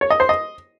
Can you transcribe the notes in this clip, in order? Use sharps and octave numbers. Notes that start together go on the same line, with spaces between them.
C#5
D#5
C5
D#5